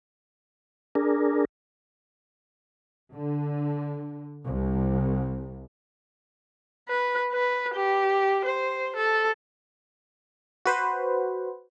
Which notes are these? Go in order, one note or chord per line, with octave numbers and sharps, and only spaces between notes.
D4 G#4 A#4
D3
C2
B4
B4
G4
C5
A4
F#4 B4 C5